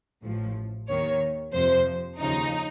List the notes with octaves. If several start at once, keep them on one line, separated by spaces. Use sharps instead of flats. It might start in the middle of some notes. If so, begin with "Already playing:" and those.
A1 A2 F3
D#2 D#3 C#5
F2 C3 F3 C5
D#2 C#3 F3 D#4